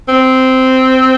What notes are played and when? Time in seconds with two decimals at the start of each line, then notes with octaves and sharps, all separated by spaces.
0.08 C4